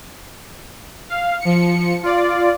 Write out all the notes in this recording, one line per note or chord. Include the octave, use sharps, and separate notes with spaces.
F5
F3 C#7
F4 D5